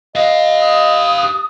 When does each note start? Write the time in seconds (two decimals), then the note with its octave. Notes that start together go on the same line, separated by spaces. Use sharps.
0.16 G4 D#5 F5
0.61 D#6